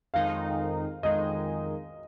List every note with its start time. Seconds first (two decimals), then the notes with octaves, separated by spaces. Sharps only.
0.14 F2 D#3 G#3 D#4 F5
1.03 F2 D#3 G#3 D#4 D#5